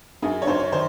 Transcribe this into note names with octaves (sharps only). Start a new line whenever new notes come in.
F#2 G#4
C#5
F#2 C5
C#5
D#3 C5